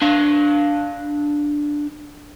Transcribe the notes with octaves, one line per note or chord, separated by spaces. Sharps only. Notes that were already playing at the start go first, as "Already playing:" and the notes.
D4 F5